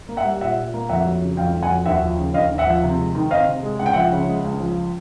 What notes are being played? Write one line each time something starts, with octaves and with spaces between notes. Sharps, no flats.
A#3
E5 F#5
G3
A#2 E5 F#5
A#2
A#3
F2 E5 F#5
F#3
C#3
F2 F5 G5
F2
F#5 G#5
F#3
D#2 E5 F#5
F3
C#3
D#2 D#5 F5
D#2
E5 F#5
F3
C3
G#3
D#3
C4 D#5 F5
C3
G#3
C#2 F#5
G5
F3 E5 F#5
C#3
G#3
C#2
F3